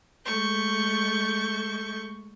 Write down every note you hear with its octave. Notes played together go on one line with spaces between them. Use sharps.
G#3 A3 C#6 G6